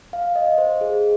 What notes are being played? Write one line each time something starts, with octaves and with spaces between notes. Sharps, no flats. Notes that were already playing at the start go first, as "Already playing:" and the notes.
F5
D#5
C5
G#4